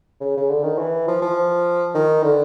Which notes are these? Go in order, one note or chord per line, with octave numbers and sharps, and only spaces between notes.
C#3
C#3
D3
D#3
E3
F3
F3
D#3
D3